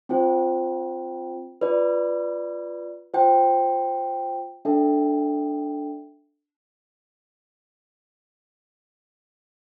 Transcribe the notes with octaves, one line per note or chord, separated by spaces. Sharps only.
C4 F4 C5 G5
F4 B4 D5
F4 C5 G5
D4 A4 E5 G5